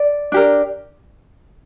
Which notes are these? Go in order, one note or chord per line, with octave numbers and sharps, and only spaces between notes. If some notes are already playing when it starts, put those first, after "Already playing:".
Already playing: D5
D4 G4 A#4